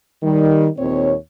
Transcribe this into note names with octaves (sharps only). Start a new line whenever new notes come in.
D#3 G3
D#2 A#2 C4 C#5